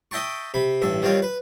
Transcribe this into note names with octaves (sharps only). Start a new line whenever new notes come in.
D#5 E5 G5 A5 C#6
C3 B5
A1 G2 E5
D#3 G3 C4 F4 C#5
B4